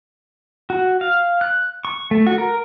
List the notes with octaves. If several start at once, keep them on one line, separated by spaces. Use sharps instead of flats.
F#4
F5
F#6
C#6
A3
F#4
A#4